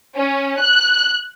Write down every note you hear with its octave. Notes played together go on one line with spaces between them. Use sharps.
C#4
F#6